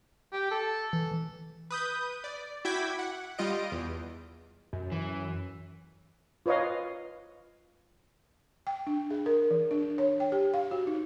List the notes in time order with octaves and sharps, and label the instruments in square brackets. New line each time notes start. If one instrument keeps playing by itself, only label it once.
[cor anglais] G4
A4
[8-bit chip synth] E3
[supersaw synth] B4 D#6 G6
D5
E4 F#4 G5 D6 G#6 B6
F#5
G3 F4 D#5 D7
E2
[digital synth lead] F#2
[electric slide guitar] E3
[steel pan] F4 B4 C#5 D#5 F5
[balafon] G5
D4
G#4
A#4
E3
D4
C#5
G5
G4
F5
F#4
D#4